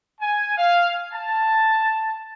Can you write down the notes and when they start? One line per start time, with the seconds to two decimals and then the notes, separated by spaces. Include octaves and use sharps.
0.20 G#5
0.57 F5
1.11 A5